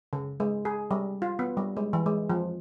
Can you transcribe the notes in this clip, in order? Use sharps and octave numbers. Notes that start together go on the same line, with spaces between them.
C#3
G#3
G#4
G3
F4
B3
G3
G#3
E3
G#3
F3